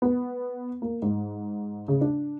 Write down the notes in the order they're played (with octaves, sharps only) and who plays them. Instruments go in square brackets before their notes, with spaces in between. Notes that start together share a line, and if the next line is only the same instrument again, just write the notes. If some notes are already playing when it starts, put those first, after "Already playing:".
[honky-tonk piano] B3
A#3
G#2
C#3
D4